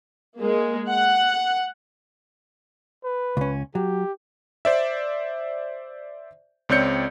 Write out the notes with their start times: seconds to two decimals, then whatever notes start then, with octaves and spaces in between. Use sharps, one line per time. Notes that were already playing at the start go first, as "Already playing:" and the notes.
0.39 G#3 A#3
0.89 F#5
3.04 B4
3.37 C#2 C#4
3.75 F#3 G4
4.65 C5 D5 E5
6.69 C#2 C4 C#5 D5 G6 C#7